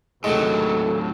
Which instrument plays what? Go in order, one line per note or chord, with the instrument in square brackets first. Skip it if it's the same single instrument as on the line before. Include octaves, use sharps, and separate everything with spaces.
[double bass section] D#2 C3 D#3 [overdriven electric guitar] A2 F#3 [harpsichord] G#3 [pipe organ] A4